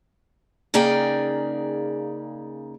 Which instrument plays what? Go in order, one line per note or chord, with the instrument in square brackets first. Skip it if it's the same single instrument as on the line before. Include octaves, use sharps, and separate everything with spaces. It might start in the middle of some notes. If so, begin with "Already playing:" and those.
[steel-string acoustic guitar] C#3 A#3 D#4 G#4 D5 G5